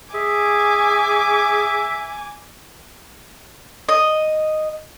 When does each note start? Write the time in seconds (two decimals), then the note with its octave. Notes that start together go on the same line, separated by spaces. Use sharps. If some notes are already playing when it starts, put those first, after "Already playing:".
0.14 G#4 E5 G#5 D6
3.89 D#5